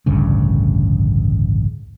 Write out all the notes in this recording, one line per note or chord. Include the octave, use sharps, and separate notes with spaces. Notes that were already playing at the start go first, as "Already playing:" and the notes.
A1 D2 G2 C#3